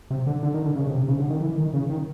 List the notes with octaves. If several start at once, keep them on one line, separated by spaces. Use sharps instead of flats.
C3
D3
D3
D#3
D3
C#3
C3
C3
C#3
D3
D#3
E3
D#3
C#3
D#3